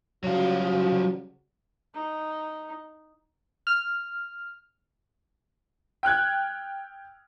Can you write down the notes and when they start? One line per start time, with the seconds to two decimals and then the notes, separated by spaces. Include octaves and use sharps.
0.24 C#3 F#3 G3 F4 F#4
1.94 D#4
3.67 F6
6.03 G5 F6 F#6 G#6